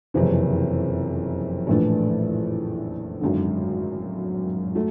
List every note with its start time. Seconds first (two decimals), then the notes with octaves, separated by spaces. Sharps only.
0.14 F#1 F2 C3 E3
1.67 A#1 A2 E3 A3 D4
3.21 G#1 F#2 D3
4.75 F#3 A3